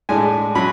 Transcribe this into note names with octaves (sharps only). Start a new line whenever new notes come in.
A2 G#3 D4 G#5
F#3 C#4 B5